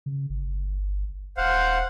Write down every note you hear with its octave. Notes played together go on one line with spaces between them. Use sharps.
C#3
G1
D#1 C5 F5 F#5